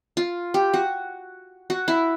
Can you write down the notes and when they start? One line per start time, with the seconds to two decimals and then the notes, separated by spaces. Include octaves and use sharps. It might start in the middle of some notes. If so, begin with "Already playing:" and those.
0.17 F4
0.54 G4
0.74 F#4
1.70 F#4
1.88 E4